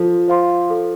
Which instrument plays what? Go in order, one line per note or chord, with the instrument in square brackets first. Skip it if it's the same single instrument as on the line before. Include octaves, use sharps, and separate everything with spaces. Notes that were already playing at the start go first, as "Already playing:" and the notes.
Already playing: [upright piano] F3 [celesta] A4
[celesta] C5 F5 C6
A4